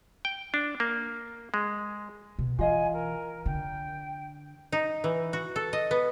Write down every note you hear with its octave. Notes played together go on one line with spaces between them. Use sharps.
G5
D4
A#3
G#3
B2
E3 F4 D#5 F5 G#5
A#4
D3 G5
D#4
E3
F#4
A4
D#5
B3